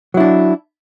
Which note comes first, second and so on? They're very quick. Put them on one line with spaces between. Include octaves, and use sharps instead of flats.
F#3 E4 D4